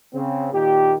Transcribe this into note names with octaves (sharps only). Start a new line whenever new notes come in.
C#3 C4
A#2 D#3 G4